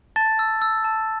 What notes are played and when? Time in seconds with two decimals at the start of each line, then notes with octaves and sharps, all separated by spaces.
0.16 A5 A6
0.39 E6
0.62 E6
0.85 A5